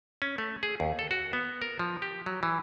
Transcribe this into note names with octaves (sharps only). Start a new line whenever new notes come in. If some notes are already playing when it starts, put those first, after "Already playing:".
C#4
A3
G#4
D#2
A4
F#4
B3
A#4
F3
G4
F#3
E3